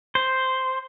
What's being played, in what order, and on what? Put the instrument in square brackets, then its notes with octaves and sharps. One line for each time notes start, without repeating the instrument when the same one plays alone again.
[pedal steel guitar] C5